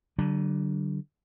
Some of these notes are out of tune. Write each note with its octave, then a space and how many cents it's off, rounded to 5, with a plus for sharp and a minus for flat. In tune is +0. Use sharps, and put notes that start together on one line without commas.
D3 +0 F#3 +45 D4 +5